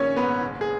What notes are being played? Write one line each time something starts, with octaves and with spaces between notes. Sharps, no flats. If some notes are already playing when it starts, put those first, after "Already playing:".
Already playing: A#1 D#3 C#4 C#5
G#2 B3 B4
F#1
G#4